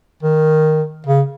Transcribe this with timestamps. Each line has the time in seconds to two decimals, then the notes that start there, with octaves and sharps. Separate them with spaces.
0.23 D#3
1.07 C#3